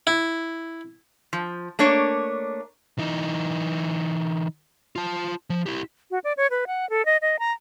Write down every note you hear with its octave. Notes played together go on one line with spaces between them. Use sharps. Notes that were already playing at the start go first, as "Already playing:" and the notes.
E4
F3
A3 A#3 D4 C#5
E3 D#4
F4 A5
F3
E4 G4
F#4
D5
C#5
B4
F#5
A4
D#5
D#5
A#5